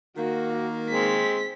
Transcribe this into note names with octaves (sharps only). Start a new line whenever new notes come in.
D#3 A#3 F#4
G#3 C4 B6